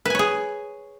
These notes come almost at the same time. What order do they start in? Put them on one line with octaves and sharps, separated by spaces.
B4 G#5 C#5 G#4